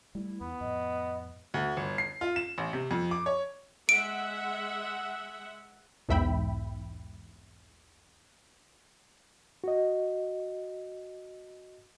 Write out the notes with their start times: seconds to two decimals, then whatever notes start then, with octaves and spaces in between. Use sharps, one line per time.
0.15 G3 A3 E4
0.41 E2 B3
0.61 F2 A2 D#5
1.54 D2
1.77 G1
1.98 C7
2.21 F4
2.36 E7
2.58 A1
2.73 C3
2.91 F2
3.11 D6
3.26 C#5
3.89 G#3 E5 F#5 D7
6.09 B1 E2 G#2 E5 G5 B5
9.64 F#4 D#5